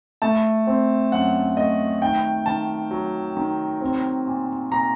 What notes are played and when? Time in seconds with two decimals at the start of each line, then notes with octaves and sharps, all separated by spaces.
0.22 A3 A5
0.67 C4
1.12 F#2 F#5
1.57 A3 D#5
2.02 D#3 G5
2.46 D#3 A5
2.91 F#3
3.37 D#3
3.81 C4
4.27 A#2
4.71 A#2 A#5